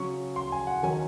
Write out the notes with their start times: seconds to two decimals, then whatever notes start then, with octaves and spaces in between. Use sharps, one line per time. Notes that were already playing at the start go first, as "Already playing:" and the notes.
Already playing: C#3 F#3 C#4 C#6
0.36 C6
0.52 G#5
0.67 F#5
0.83 D#3 F#3 C#4 G#5